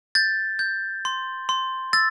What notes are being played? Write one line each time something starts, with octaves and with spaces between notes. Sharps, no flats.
G6 A6
G6
C6
C6
E6 A6